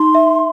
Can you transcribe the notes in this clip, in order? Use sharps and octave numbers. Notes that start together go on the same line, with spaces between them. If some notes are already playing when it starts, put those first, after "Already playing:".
Already playing: D#4 C6
E5